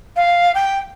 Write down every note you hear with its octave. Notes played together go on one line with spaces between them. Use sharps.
F5
G5